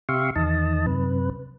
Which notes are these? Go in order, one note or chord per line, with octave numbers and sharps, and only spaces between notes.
C3 G4 E5 F5 C6 C#6
E2 D#3 D#5 A5
F#2 C3 B4